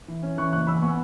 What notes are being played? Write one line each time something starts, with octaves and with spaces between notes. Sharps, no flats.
E3
C#4
E3 C#6 F#6
F#1 C#6 F#6
E2 B5 E6
B3 G#5 C#6